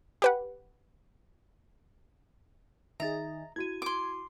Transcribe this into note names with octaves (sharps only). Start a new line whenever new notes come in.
G4 B4 F#5
D#3 D#4 G#4 E5 A#5 A6
E4 F#4 G#6 D#7
C6 D6